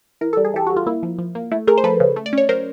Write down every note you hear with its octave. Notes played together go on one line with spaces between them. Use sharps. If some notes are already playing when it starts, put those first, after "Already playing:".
E3 A#4
G3 A4
G#4
E3 G4 A4
G3 F#4
F4
A#3 E4
F3
F3
A#3
A3 E4
A3 G#4 A#4
C5
F3 A4 B4
C#3
A3
D5
C#4 C#5
F#3 A#4 C5